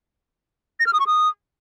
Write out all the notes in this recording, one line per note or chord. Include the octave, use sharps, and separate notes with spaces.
A#6
F6
D#6
C#6
D#6